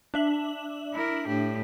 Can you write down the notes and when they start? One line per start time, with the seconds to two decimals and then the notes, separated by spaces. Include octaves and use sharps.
0.14 D4 E5 F#7
0.94 E4 A#4
1.28 A2 G4